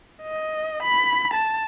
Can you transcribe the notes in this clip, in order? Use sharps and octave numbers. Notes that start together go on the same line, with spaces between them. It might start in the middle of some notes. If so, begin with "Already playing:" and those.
D#5
B5
A5